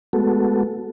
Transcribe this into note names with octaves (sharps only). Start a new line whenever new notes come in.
G#3 A3 B3 F#4 A4